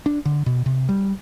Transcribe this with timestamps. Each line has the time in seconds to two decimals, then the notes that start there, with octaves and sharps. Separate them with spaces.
0.06 D4
0.25 D3
0.46 B2
0.66 C3
0.89 G3